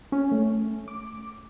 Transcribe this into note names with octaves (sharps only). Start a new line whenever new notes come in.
C#4
A3
D6